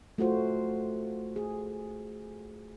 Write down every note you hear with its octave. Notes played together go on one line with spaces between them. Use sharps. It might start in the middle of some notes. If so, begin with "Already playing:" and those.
A3 F4 F#4 C5
G#4